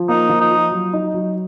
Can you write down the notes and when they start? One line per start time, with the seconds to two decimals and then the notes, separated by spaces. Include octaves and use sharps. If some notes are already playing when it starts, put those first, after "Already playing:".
Already playing: F3
0.09 A#3 D#4
0.29 F3
0.41 D#4
0.50 F4
0.72 F#3
0.93 D#4
1.14 F#3